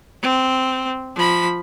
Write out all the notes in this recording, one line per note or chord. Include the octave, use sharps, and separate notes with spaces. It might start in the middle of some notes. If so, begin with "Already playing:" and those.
C4
F3 B5